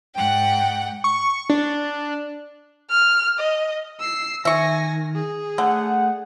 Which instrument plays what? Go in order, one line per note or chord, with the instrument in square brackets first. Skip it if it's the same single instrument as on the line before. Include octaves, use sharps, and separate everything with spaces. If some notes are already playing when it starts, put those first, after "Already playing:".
[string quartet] G#2 F#5 F#6 [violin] G5
[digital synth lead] C#6
D4
[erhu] F6
D#5
[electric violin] E6 C7
[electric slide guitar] D#3 [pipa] E5 C#6 [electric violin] G#5 A#6
[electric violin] G#4
[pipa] D3 [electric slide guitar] A3 [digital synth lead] F#5